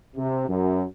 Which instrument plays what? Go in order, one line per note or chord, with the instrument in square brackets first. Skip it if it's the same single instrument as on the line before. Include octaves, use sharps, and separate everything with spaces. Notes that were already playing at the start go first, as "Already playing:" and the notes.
[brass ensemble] C3
F#2